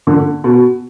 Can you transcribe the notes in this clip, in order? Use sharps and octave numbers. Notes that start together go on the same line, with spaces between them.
D3
B2